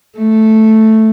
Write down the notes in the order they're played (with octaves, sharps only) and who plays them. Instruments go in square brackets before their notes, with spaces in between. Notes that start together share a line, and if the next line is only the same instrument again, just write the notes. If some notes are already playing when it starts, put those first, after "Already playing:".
[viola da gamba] A3